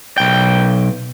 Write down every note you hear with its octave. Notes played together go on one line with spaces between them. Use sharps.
B1 G5